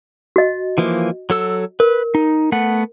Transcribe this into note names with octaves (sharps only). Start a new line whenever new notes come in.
F#4 D#5
E3 F3 A#3
F#3 A4 E6
A#4 B4
D#4
A3 B3 F#5